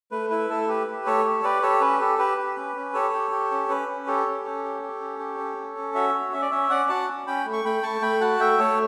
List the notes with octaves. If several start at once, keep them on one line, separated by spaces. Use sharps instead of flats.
A3 B4
E4 B4
A3 A4
G4 B4
G4
A3 A4 C#5
G4
G4 B4 D5
G4 A4 C#5
C#4 B4
G4 A4
G4 B4
G4
C#4
C#4
G4 A4 C#5
G4
G4
C#4
C#4 B4
C#4
G4 A4 C#5
C#4
C#4
G4
G4
C#4
G4
C#4
C#4
C#4
F#4 C#5 E5
F#4
C#4 E5
D5
C#4 C#5 E5
C#4 D5 F#5
F#4 F#5 A5
C#4
C#4 G5 B5
A3
C#6
A3 G5 B5
A3 A5 C#6
A3 G5 B5
F#4 F#5 A5
A3 E5 G5
A3 A4 C#5